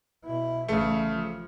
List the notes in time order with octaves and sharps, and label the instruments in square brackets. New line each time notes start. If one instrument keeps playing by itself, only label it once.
[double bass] B2 E4
[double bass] A1 E3 [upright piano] C#3 A3
[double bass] F3